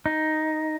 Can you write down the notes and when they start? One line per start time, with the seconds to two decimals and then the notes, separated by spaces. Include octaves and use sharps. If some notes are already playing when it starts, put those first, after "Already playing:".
0.06 D#4